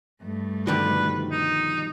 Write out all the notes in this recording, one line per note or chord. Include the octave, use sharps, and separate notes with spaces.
G2 A3
B2 D3 D#3 F3 G3 G4 B4
D#4